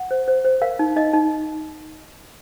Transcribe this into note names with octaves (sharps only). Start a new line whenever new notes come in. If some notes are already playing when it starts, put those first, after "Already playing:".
Already playing: F#5
C5
C5
C5
A#4 F5
D#4
D#4 D#5
D#4